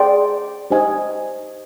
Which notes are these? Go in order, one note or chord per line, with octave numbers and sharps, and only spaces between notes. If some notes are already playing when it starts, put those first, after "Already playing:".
Already playing: G#4 D5 G5 C6
D#4 G4 C5 D#5 G#5